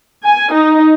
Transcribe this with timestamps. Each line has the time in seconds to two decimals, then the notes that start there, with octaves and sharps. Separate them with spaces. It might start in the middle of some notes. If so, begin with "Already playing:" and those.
0.24 G#5
0.53 D#4